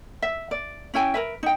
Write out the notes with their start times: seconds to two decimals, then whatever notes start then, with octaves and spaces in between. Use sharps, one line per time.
0.22 E5
0.51 D5
0.94 C#4 E4 G5 G#5
1.14 A#4 B4 E5
1.43 D#4 G5